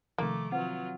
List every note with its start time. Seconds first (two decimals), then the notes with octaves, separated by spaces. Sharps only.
0.18 C3 D#3 F3 A3 A#3 D6
0.52 F#3 C4 F4 B4 F#5